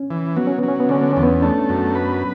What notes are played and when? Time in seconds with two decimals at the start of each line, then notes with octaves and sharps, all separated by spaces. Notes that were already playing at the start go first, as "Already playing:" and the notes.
Already playing: C#4
0.11 E3
0.36 F#3 B3
0.47 C#4
0.58 F#3 B3
0.68 C#4
0.80 B3
0.89 D3 C#4
1.01 B3
1.13 E2 C#4
1.23 B3
1.42 A3 D4
1.69 F#2
1.95 B4